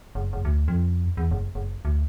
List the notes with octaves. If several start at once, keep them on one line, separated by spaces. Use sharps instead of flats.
F#1
F#1
D2
F2
E2
F#1
F#1
D2